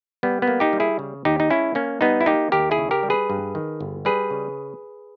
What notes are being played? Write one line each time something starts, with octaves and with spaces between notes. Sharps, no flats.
G3 B3
B3
A#3
D#4 G4
G3
E4 G#4
C#3
D#2 D#4 G4
D#4
G#3 C#4 E4
A#3 C#4
G3 B3 D#4
E4
A#3 D#4 G4
D#2 G4 A#4
E4 G#4
C#3
G4 A#4
G3
G#4 B4
G2
D#3
G1
G3 G#4 B4
C#3